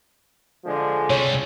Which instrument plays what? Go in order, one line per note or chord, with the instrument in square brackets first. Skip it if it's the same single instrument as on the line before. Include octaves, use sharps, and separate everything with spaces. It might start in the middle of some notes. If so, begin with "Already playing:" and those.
[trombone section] D3 F3 G#3
[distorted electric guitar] C3 G3 [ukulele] C#5